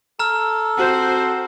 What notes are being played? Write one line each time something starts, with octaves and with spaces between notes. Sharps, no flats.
A4 A#5 F6
C4 F#4 C5